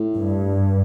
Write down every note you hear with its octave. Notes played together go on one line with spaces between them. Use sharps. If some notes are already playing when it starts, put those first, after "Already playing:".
Already playing: A2
G2